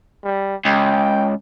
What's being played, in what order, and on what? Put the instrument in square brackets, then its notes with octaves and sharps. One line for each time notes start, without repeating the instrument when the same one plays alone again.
[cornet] G3
[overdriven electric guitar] C#2 [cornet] G5